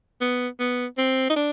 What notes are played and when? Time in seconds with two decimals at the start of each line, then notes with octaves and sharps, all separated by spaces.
0.21 B3
0.60 B3
0.98 C4
1.30 D#4
1.36 D4